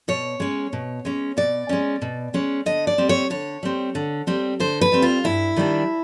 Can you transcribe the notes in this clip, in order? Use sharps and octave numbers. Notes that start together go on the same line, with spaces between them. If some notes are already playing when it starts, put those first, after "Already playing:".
B2 C#5
G#3 C#4
B2
G#3 C#4
B2 D5
G#3 C#4
B2
G#3 C#4
D3 D#5
D5
G3 C4
C#5
D3 C#5
G3 C4
D3
G3 C4
D3 C5
B4
G3 C4
F4
G2 E4
D#3 G3 B3 D4